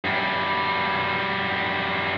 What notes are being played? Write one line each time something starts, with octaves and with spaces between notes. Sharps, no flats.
F#2 G3